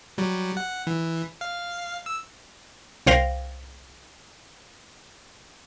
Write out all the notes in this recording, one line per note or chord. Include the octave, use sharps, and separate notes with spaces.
F#3 G3
F#5
E3
F5
E6
C2 C5 F5 G5 A#6